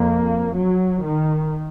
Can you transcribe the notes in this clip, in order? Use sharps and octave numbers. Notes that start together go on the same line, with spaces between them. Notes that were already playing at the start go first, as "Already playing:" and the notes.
Already playing: F2 A#3
F#3
D#3